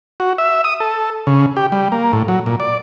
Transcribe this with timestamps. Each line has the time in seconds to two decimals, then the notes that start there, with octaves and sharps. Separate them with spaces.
0.20 F#4
0.38 E5
0.64 D#6
0.80 A4
1.27 C#3
1.56 G4
1.72 G3
1.92 A#3
2.13 A2
2.28 F#3
2.46 A#2
2.60 D5